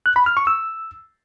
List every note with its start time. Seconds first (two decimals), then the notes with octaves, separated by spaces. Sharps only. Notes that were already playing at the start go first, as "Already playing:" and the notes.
0.06 F#6
0.16 B5
0.26 F6
0.37 C#6
0.47 E6